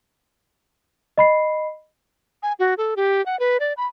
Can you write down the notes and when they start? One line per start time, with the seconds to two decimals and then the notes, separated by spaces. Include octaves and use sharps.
1.18 D#5 B5 C7
2.43 G#5
2.59 F#4
2.78 A4
2.96 G4
3.26 F#5
3.40 B4
3.60 D5
3.77 B5